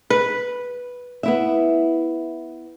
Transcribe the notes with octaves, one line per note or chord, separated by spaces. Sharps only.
B4
B3 E4 E5